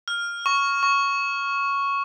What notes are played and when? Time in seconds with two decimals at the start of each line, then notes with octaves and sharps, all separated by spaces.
0.08 F6
0.46 C#6
0.83 C#6